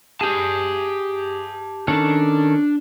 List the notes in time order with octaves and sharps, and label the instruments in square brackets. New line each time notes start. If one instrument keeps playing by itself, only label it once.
[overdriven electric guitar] G4 A5 [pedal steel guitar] G#4
[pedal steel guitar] D#3 C#4 A4 [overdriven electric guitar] D4